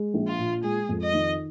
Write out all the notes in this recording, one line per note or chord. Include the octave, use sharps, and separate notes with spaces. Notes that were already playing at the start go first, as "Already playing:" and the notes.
Already playing: G#3
A#1
F4
A#2
G#3 G#4
F2
D#5
D#3